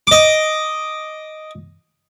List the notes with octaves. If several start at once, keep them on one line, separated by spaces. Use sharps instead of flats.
D#5 D6